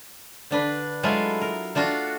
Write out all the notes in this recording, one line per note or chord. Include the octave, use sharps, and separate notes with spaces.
D3 D4 B4
F#3 G#3 A3 E4 F4
A#4
A3 D4 F4 F#4